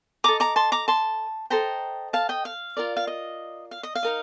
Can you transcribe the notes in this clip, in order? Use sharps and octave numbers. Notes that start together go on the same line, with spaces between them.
A4 D#5 A#5 D6
A#5 D6
A5 C6
A#5 D6
A5 C6
A4 C5 D#5 G5 A#5
F5 A5
D#5 G5
F5
F4 A#4 D5
F5
D#5
F5
D#5
F5
D#4 A#4 D#5